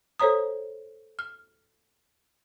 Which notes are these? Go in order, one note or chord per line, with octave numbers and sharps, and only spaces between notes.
A4 C5 C#5 A#5 D#6
F6